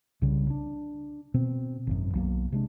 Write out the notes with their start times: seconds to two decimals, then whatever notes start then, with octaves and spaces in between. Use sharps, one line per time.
0.22 C2 C#3 G3
0.50 D4
1.34 B2 C4
1.87 G#1 F#2
2.14 B1 F#3 A#3
2.52 C3 G#3 D4